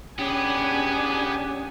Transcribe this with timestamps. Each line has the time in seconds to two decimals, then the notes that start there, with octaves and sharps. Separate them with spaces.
0.19 B3 C#4 D4 G4 G#4 G#5